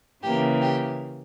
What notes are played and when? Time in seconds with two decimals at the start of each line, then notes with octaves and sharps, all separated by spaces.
0.23 C#3 E3 A#3 G4
0.62 G4